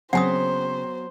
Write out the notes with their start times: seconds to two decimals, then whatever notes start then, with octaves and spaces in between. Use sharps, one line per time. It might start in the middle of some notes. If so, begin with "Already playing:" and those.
0.13 C#3 F#3 B3 C4 C5 F#5 G#5 D#6